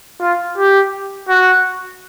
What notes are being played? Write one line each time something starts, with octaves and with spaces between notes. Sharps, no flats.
F4
G4
F#4